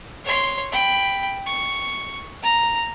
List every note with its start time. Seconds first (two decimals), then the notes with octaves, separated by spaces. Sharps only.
0.25 C#5 C6
0.72 G5 B5
1.46 C#6
2.42 A#5